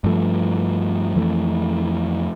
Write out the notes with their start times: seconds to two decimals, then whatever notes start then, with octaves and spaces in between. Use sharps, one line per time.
0.04 G2 F3 A3
1.16 F2 E3 A3